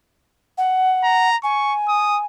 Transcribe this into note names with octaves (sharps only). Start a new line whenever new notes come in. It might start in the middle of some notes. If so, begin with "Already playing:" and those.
F#5
A#5
G#5 C#6
D#6